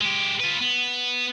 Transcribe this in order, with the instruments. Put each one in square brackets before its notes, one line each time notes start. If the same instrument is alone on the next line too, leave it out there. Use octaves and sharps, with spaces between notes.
[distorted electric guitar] G#3 G4
F4 B4
B3